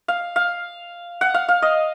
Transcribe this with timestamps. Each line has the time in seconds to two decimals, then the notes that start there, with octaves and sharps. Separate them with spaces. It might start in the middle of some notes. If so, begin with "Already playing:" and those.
0.08 F5
0.36 F5
1.21 F#5
1.34 F5
1.49 F5
1.62 D#5